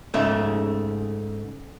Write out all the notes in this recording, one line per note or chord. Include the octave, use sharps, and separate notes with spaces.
G#2 C#3 A3